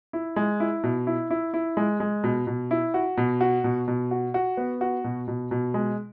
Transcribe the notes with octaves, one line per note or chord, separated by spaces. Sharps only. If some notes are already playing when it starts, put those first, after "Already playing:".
E4
G#3
E4
B2
E4
E4
E4
G#3
G#3
B2
B2
E4
F#4
B2
F#4
B2
B2
F#4
F#4
B3
F#4
B2
B2
B2
G#3